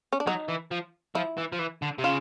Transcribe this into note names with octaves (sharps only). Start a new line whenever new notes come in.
C#4
D4
F#3 D#4
E3
F3
F3 E4
E3
F3
E3
D3
C3
C#3 F4